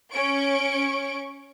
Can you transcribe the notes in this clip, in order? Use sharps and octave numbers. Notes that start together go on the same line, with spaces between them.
C#4 C#6 D7